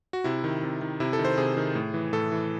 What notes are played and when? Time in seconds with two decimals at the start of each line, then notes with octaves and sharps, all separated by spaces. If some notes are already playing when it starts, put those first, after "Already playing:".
0.13 F#4
0.24 C3 E4
0.44 D#3
0.63 C3
0.81 D#3
1.00 C3 E4
1.13 A4
1.19 D#3
1.25 C5
1.38 C3 G#4
1.57 D#3
1.75 A2
1.94 E3
2.13 A2 A4
2.32 E3